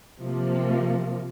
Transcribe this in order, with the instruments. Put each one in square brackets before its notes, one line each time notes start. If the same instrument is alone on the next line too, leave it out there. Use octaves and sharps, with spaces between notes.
[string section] C3 F3 A#3